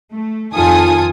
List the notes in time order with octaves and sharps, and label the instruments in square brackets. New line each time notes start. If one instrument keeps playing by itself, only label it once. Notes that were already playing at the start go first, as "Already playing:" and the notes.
[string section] A3
F2 D#3 F4 A4 G#5 D#6